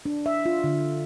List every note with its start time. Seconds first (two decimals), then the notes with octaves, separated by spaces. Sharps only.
0.05 D4
0.26 E5
0.46 F4
0.64 D3